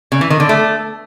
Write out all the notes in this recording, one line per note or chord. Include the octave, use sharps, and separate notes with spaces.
C#3
E3
D#3
D3
A3